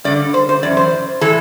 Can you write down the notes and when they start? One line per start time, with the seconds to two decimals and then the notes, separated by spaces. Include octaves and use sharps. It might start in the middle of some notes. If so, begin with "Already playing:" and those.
0.04 G2 D3 D5
0.34 C5
0.49 C5
0.63 F#2 E3 D5
0.77 C5
1.21 A2 E3 A4